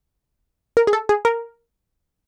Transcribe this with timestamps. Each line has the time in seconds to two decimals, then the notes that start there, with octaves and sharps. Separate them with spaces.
0.77 A#4
0.87 G#4
0.93 A4
1.09 G#4
1.25 A#4